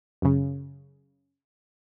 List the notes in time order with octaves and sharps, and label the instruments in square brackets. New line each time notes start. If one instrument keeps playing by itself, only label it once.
[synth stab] F#2 C#3